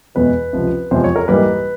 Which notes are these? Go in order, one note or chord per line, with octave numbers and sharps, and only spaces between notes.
E2 B2 G#3 B3 B4
C#2 C3 F3
E2 C3 F3 G#3 C5
C#5
A#4
G#2 E3 G3 A#3 B4